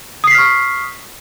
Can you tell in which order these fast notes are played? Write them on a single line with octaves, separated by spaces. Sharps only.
D#6 C7 B6 F6 C#6